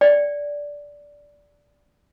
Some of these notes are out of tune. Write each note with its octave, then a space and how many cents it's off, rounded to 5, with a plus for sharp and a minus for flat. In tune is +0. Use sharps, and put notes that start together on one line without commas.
D5 -10 G5 +0